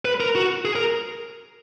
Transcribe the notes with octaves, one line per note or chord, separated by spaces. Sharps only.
B4
A#4
F#4
G#4
A#4